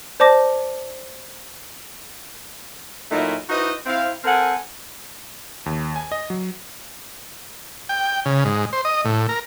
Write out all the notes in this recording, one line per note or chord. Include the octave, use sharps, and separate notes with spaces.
C5 D5 A5 D6 A#6
A#2 F#3 A3 D#4 E4 A#4
D#4 E4 F#4 B4 C5 D#5
C4 E4 F5
C4 A4 A#4 F#5 G#5
D#2
G#5
D#5
F#3
G5
C#3
G#2
C5
D#5
A2
A#4